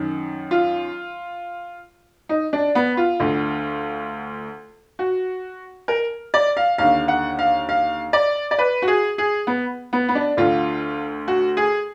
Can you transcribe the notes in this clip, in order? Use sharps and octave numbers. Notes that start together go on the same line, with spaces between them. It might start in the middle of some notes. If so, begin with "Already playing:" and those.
Already playing: F#2 D#3
F4
D#4
D4
B3
F4
D2 D3
F#4
A#4
D5
F5
D#2 D3 F5
F#5
F5
F5
D5
D5
B4
F#4
G#4
G#4
B3
B3
B3
D4
D2 D3 F4
F#4
G#4